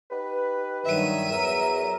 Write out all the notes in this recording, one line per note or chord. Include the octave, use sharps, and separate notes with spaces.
D#4 G4 B4
G2 D#3 F#3 E5 D#7
E2 F#3 A#4